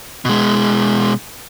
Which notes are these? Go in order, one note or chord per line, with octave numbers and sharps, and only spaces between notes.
B2 G#3